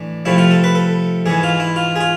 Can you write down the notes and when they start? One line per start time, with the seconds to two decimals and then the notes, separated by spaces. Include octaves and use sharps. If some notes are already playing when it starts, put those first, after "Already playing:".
Already playing: A2 E3 D4
0.25 C3 F3 A3 C4 E4
0.38 F4
0.51 A4
0.64 B4
0.75 A4
1.26 G#2 E3 B3 G#4
1.43 F4
1.60 E4
1.76 F4
1.96 G#4
2.00 F4